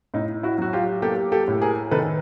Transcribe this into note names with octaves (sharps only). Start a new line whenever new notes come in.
A2 D#4
E4 F#4
F#3 F#4
F4 G4
A#3 G4 A4
G4 A4
A2
G#4 A#4
D#3 A4 B4